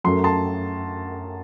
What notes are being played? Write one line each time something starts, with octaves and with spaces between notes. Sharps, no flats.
F#2 F#3 A3 C6
A5 C6